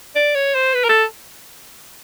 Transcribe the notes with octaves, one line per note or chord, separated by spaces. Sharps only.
D5
C#5
C5
B4
A#4
A4